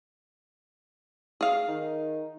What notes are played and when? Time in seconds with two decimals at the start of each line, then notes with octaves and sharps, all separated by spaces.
1.41 G#4 F5
1.67 D#3 D#4